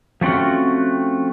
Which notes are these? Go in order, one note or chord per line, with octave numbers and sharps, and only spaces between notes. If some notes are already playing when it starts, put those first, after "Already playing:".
F3 A3 C4 C#4 F#4